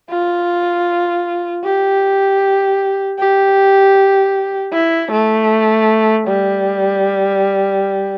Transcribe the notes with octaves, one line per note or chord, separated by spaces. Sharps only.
F4
G4
G4
E4
A3
G3